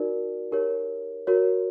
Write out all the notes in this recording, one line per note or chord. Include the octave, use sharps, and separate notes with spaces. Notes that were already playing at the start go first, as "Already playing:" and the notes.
Already playing: D#4 F#4 A#4 D5
D#4 G4 A#4 C#5
F#4 A#4 C#5